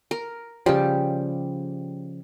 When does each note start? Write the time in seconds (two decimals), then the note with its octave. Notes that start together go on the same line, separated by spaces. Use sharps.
0.11 A#4
0.66 C#3 F3 G3 G4